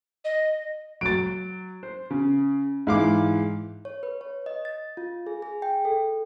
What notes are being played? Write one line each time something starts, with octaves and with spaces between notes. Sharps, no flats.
D#5
F#3 A6 D7
C5
C#3
G#2 E3 E4 F5 D6
C#5
B4
C#5
D#5
A6
F4
G#4
G#4
G5
A4